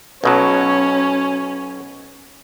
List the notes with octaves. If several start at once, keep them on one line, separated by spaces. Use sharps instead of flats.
B1 B2 F#3 C#4